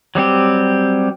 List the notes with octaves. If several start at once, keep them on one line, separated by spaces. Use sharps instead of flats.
F#3 G3 C4 G4